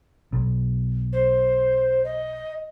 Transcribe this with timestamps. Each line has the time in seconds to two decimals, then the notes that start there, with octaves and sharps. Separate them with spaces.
0.33 B1
1.13 C5
2.04 D#5